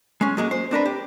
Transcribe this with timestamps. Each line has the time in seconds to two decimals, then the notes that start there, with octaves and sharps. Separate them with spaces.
0.21 G#3 C#4
0.37 F#3 G#3 A#3
0.51 C5
0.71 C4 D4 A#4 B4
0.86 G4